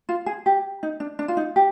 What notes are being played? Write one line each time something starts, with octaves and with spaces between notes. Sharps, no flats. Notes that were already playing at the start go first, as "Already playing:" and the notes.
F4
G#4
G4
D#4
D4
D4
F4
D#4
G4